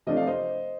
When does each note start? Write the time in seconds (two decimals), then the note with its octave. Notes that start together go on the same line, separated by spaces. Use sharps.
0.07 C3 F3 A3 D4 D#5
0.17 F5
0.27 C5 D#5